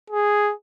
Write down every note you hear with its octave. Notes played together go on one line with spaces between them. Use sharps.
G#4